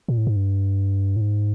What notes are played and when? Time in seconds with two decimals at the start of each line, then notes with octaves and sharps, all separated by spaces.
0.08 A#2
0.18 A2
0.27 G#2
0.36 G2
1.16 A2
1.21 G#2